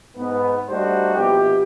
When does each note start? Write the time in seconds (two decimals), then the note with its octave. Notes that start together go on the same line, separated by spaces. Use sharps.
0.16 G#2 B3
0.68 G3 A3 D4 D#4 F#4 C5
1.15 A#1 B2 E4 G4